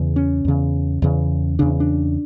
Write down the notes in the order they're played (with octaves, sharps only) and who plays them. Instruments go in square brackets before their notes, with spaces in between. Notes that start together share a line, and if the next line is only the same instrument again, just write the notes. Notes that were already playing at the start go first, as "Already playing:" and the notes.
Already playing: [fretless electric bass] E2 C#3
C#4
E2 C#3
E2 C#3
E2 C#3 D4
D4